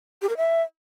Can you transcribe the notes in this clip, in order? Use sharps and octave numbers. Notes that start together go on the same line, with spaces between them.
G4
A#4
E5